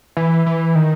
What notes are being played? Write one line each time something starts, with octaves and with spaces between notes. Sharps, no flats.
E3
E3
D#3